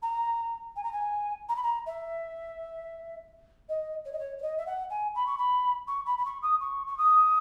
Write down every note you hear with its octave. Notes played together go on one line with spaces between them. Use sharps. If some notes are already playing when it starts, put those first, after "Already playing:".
A#5
G#5
A#5
G#5
A#5
B5
A#5
E5
D#5
C#5
D#5
C#5
C#5
D#5
E5
F#5
G#5
B5
C#6
B5
C#6
B5
B5
C#6
D#6
C#6
C#6
D#6